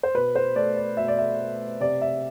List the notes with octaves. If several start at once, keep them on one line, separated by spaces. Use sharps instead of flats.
C5
B2 B4
C5
A3 D5
D5
B2 E5
D5
E5
A3
C3 D5
E5